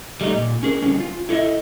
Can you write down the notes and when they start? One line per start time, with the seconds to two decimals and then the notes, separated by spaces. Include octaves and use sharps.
0.21 G3 A3 D#4
0.34 A#2
0.63 C#4 G#4 A#4
0.82 D3 G3 C4 C#4
1.00 F4
1.29 E4 A4 C#5 D#5 E5